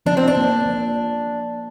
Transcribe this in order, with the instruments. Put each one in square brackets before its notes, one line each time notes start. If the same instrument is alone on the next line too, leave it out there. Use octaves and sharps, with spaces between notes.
[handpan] F3 [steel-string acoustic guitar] D4
[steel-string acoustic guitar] C4
D4
[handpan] A#3
F3